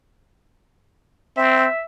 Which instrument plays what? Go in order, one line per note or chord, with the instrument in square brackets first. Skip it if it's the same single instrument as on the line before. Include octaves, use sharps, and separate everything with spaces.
[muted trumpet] C4 [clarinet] E5